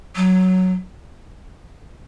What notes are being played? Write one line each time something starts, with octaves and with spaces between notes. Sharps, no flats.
F#3